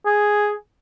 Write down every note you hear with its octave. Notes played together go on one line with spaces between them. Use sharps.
G#4